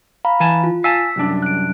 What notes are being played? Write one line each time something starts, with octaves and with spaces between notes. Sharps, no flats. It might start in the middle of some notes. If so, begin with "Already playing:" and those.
F5 A#5 B5
E3 G#5 A5
F4
F5 G#5 A5 E6 B6
C2 F#2 D4
F#6 D7